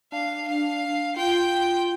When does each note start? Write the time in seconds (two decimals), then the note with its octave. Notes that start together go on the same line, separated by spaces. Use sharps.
0.12 D4 F5
0.48 F5
1.16 F4 G5